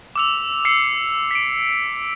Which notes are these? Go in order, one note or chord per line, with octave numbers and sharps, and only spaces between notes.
D6 E6 F7
E6 C7 C#7 F7
B6 D7